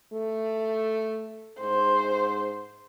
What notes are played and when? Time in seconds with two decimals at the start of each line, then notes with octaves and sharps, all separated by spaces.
0.13 A3
1.60 G#2 C5